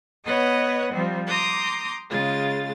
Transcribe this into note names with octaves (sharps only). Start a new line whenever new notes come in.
B3 B4 C#5 D#5 F#5 F#6
F3 G3 C4
A#5 C6 D6 D#6 G6
C#3 G#3 F4 A6